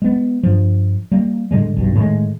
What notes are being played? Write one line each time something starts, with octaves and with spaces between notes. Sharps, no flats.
G#3 B3
G2 F3
G3 A#3
A2 D3 G3 G#3
B1 E2 G2
A2 D#3 F3 G#3